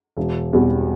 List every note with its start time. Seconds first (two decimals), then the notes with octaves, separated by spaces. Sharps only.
0.17 E1
0.53 E2 B2 G3 C4